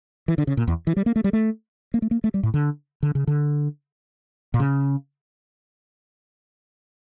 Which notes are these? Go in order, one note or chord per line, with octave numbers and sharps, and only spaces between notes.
E3
D3
C#3
A#2
E2
E3
G3
A#3
A3
G3
A3
A#3
A3
A#3
A3
G3
A2
D3
D3
C#3
D3
A#2
C#3